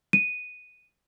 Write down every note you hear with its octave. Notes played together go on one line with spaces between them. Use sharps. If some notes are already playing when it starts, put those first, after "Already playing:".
D#7